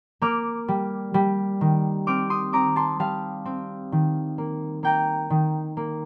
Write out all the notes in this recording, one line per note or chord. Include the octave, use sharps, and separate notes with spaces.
A#3 D6 F6
G3
G3
D#3
C4 D6 F6
C6 D#6
C4 A#5 D6
A5 C6
G3 F5 A5
C4
D#3
A#3
A#3 G5 A#5
D#3
A#3